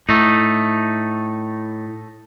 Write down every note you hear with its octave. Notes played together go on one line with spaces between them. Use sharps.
A2 A3 D#4